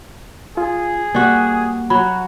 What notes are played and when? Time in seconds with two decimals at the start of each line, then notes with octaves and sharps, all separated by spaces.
0.57 F4 G#4
1.15 G3 A#3 F#4
1.90 F#3 F#4 B5